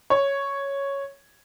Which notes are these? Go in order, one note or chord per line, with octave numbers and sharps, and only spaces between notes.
C#5